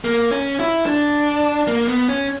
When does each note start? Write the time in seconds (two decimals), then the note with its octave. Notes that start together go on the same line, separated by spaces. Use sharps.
0.04 A#3
0.31 C#4
0.60 E4
0.86 D4
1.67 A#3
1.88 B3
2.09 C#4